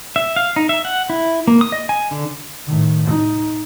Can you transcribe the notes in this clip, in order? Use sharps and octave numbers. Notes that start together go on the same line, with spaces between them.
E5
F5
D#4
E5
F#5
E4
A#3
D#6
D#5
G#5
D3
A2 D#3
D#4